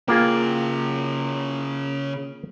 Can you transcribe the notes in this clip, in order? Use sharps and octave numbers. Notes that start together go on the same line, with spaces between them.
C#3 A#3 F4 G#4 G5